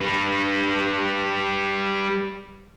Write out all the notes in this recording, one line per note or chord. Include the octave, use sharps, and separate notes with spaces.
G3 B4